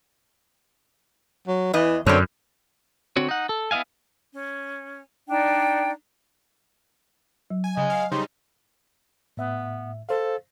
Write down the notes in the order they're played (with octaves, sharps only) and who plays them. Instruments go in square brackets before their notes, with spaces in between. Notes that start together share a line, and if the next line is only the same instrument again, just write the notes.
[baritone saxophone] F#3
[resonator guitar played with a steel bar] E2 D#5 [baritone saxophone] E3
[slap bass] F#2 [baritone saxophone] D3 [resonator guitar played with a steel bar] C4 C#5
[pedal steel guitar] D3 C4 F#4 C#5
D#4 F#5
A4
B3 E4 D#5 F5 G#5
[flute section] C#4
D4 D#4 D5 G5
[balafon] F#3
[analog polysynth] G#5
[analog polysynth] C#3 [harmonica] D#5 G#5
[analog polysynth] F5
[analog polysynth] C#3 G3 D#4 [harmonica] C5
[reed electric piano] A2 E5 [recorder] B3
[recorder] A4 [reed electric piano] C5 F5